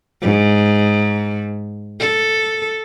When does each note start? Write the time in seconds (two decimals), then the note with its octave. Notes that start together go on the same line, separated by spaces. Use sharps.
0.22 G#2
2.00 A4